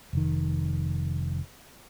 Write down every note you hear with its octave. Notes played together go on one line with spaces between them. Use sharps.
F1 D#3